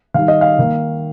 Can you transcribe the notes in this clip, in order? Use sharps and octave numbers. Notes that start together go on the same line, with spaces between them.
D#3 G3 D#4 F5
D#5
F5
D#3 A#3 D#4